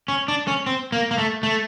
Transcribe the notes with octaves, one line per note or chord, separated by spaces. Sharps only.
C#4
D4
C#4
C4
A#3
A#3
A3
A3